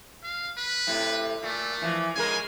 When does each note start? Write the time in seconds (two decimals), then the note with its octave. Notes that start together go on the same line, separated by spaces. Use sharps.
0.23 F5
0.57 B4
0.87 A2 C3
1.43 A#2 A3
1.82 E3 F3
2.16 C#3 G#3 A#4 G#5